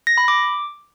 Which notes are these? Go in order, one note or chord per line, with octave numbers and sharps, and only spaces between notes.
A#6
B5
D6